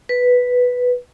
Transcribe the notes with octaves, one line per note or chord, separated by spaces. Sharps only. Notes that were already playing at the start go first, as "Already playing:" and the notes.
B4